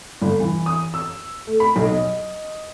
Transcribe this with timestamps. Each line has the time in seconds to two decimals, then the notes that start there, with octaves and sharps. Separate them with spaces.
0.22 G1
0.40 E3
0.66 D#6
0.94 E6
1.47 A3
1.60 B5
1.76 B1
1.89 D#5